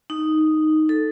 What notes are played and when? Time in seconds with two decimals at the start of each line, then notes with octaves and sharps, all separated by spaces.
0.10 D#4
0.89 A4